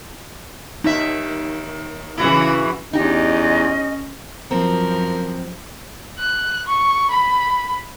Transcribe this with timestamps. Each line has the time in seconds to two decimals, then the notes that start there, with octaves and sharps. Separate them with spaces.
0.84 D#2 D#3 D#4 E5
2.18 C#3 E3 E4 F#4
2.93 E2 C#4 D#4 G4 D#5
4.51 F#2 F3 C4 A#4
6.19 F#6
6.67 C#6
7.11 B5